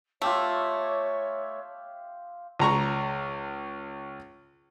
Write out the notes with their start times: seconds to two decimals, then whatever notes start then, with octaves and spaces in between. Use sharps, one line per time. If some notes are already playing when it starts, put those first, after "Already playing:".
0.22 A3 F4 G4 C#5 E5
2.59 C#2 A#5 C#6